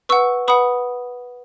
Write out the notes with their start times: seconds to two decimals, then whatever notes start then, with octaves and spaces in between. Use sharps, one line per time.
0.09 B4 F#5 C#6 E6
0.48 B4 F#5 B5 D#6